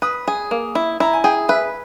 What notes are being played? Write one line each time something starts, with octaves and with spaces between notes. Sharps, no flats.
B4 D#6
G#4
A#3
E4
E4 A#5
G#5
G#4 G5
B4 E5